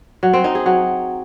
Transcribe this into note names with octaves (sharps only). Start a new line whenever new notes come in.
F#3
C4
D#4
G#4
F#3